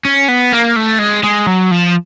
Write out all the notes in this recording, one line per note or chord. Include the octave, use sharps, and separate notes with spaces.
C#4
B3
A#3
A3
G#3
G#3
F#3
F3